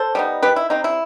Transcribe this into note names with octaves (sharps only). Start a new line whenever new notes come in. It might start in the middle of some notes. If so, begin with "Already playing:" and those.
Already playing: A4 C5
G3 B3 D#4
D#3 G4 B4
E4
G3 C4 D#4
E4